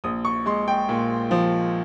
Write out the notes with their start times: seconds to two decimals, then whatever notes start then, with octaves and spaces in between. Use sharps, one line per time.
0.04 A#1 D#6
0.25 C#6
0.46 G#3 C6
0.68 G5
0.89 A#2
1.31 F3